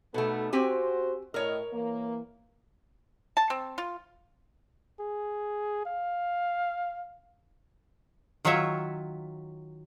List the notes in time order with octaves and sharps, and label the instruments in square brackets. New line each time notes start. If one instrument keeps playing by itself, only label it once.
[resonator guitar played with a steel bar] B2 A3 [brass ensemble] B3 D#4 A4
[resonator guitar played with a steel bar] C4 G4 G#5 [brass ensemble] F#4 C5
[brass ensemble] A2 D#5 [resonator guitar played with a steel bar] A#4 C#5
[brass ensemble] E3 A#3
[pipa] A5
C4
F4
[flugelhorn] G#4
F5
[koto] D#3 F#3 F4 C#5 E5